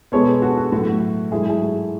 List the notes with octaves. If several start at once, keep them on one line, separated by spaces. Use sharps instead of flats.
B2 G#3 B3 A4 C#5
F#4 A4
F#4
A2 F#3 A3 F#4
F#4
G#2 F#3 A3 E4 G#4
G#4
F#4